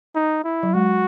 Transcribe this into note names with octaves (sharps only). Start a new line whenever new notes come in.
D#4
E4
F#3
G#3 F#4